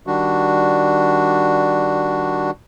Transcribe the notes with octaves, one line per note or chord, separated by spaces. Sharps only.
D#3 G3 D4 F#4